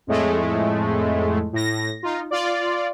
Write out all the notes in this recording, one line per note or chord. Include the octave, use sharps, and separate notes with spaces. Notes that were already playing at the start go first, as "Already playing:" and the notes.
F2 A2 G#3 A3
A2 A#6
D#4 F4
F4 D5